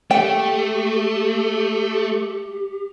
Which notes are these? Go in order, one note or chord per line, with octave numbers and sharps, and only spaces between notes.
A3 G4 G5